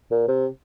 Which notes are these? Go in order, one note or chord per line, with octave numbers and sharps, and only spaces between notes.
A#2
C3